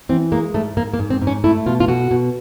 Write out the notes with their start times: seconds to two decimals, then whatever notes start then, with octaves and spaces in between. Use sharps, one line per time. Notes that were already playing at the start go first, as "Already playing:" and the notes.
0.09 E3 C4
0.32 G#3 A#3
0.54 G#2 A3
0.77 G#2 A#3
0.94 A#3
0.99 G#2
1.10 C4
1.22 G#2
1.27 C#4
1.44 A3 E4
1.66 B2 F4
1.80 F4
1.88 B2 F#4
2.11 B2